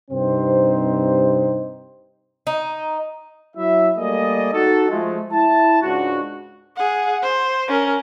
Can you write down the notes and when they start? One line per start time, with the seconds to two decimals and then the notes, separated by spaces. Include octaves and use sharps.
0.11 G2 C3 C4 D#4 C5
2.47 D#4
3.57 F#3 E4 E5
3.97 G3 A3 A#3 G#4 D5 D#5
4.53 D#4 F#4 A4
4.90 F3 G#3 A3
5.33 E4 A5
5.82 C#2 G#2 D4 F#4
6.77 G#4 F#5
7.23 C5
7.68 C#4 A#4